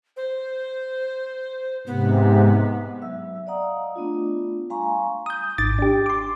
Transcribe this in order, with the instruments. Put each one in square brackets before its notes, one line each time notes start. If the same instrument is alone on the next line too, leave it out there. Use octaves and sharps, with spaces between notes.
[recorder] C5
[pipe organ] G#2 C3 [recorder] B3
[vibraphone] F#3 E5 E6
D5 D#5 F5 F#5 A#5 D#6
A3 B3 D4 F4
G3 F5 G#5 A#5 C6 C#6
[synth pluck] D#6 G6
G#1 D6 A6
D4 G4
C6 D6